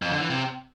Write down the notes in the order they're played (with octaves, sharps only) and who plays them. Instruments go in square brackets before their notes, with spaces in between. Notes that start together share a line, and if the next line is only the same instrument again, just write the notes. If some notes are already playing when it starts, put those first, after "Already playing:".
[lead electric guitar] F2
D3
E3
C3